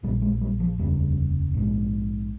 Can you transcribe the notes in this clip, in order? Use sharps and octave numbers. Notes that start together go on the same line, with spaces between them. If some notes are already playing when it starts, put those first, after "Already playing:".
A#1 A#2 G3
G#3
G3
F3
F1 D#2 C#3 G3
A#1 G#2